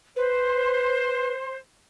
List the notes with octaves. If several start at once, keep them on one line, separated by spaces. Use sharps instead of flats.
B4 C5